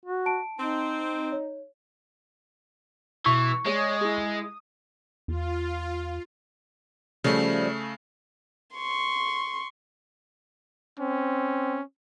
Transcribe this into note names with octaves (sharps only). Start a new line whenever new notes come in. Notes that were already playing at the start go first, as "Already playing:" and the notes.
F#4
A5 D7
C4 D#4
C#5
B2 E3 C#6
G#3 C#5 D5 G#5 D#6
E4 G#4
E2 F4
C#3 F3 G3 A3 C#4
C6 C#6
C4 C#4